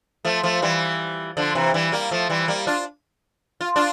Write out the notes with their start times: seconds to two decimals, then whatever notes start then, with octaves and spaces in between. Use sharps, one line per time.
0.25 F3 A3
0.43 F3 A3
0.62 E3 G3
1.37 D3 F3
1.55 C3 E3
1.74 E3 G3
1.92 G3 A#3
2.11 F3 A3
2.29 E3 G3
2.48 G3 A#3
2.67 D4 F4
3.61 F4
3.76 D4 F4